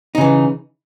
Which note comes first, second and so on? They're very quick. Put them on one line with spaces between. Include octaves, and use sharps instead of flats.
D#4 C#3 E3